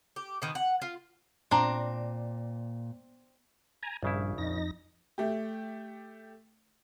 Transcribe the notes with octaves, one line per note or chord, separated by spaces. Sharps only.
G4
B2 D#3
F#5
F4
A#2 C4 D4 A#5
G#5 A#5
A#1 G2 C#3 E4
F2 D#4 A#6
A3 G4